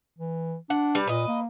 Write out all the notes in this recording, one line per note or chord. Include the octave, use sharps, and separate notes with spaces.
E3
D4 F#5
G3 B4
A#2 B4 D#5
A#3